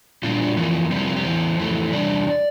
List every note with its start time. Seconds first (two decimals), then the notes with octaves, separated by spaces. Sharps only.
0.23 A#2 G3 A#3 D4 F4
0.57 F2 E3 A#3
0.91 F2 C3 G3 C4
0.99 E4
1.08 F4
1.16 G4
1.24 E2 E3 C5
1.59 F2 E3 A3
1.92 E2 C3 G3 D4 D5